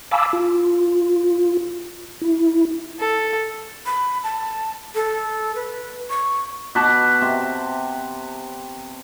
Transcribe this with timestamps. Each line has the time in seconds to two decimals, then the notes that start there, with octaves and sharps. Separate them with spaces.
0.11 F5 G#5 A5 B5 D6 E6
0.33 F4
2.22 E4
2.99 A4
3.86 B5
4.23 A5
4.95 A4
5.55 B4
6.10 C#6
6.75 B2 B4 A5 D6
7.22 C3